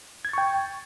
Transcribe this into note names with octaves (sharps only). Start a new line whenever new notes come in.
G5 C#6 G#6 A6